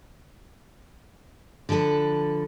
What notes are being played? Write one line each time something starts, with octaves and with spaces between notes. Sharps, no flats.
D3 F3 D4 A4 B4